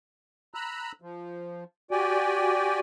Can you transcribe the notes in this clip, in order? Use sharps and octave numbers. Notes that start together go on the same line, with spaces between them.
A#5 B5 E6 F#6
F3
F#4 G4 D5 G5 G#5